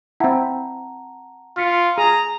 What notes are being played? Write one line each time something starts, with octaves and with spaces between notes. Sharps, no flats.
C4 E4 F#5 A5 A#5
F4 F6 B6 C#7
G#4 A#5 D#7